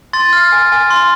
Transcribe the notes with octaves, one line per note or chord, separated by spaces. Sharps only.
C6 A6
F6
G#5
G#5
C6